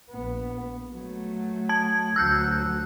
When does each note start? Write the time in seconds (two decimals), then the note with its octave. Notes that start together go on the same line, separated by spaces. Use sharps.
0.11 A#1 B3
0.94 F#3 A3
1.69 A5 G#6
2.16 D2 F#3 E6 F#6 G6